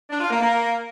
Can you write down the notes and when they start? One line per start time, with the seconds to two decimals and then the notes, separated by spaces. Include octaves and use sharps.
0.10 D4
0.20 F4
0.31 A#3
0.41 A#3